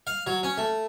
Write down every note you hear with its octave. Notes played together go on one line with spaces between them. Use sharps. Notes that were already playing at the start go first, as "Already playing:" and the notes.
F5
F#3
C#4
A3